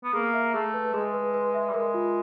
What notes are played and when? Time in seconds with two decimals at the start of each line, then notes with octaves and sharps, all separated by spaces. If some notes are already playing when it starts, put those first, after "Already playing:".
0.04 B3
0.13 A#3 G#4
0.33 E5
0.54 A3 G#4
0.74 B4
0.94 G#3 G#4
1.14 B4
1.34 B4
1.54 E5
1.69 G3
1.74 G#3 A#4
1.94 F4